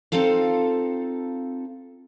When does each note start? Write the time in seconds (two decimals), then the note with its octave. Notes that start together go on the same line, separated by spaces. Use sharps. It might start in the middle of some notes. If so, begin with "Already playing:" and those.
0.12 C4 D#4 F4 A4 F5